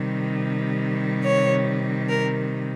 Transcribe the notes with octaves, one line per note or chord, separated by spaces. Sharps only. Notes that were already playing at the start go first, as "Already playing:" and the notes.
Already playing: C3 D#3 G3
C#5
A#4